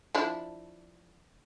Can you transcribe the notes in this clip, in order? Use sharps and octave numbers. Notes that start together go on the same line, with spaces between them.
F3 D4 E4